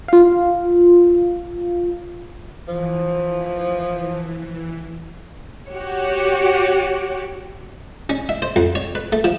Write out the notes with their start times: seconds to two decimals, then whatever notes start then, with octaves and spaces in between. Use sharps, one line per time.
0.08 F4 F5
2.68 E3 F3
5.69 F#4 G4 C#5
8.10 C#4
8.29 E5
8.42 C5
8.56 F2
8.75 C#5
8.95 B4
9.12 A3
9.24 F3